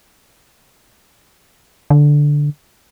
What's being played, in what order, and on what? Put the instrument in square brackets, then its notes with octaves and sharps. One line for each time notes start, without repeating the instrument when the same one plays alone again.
[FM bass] D3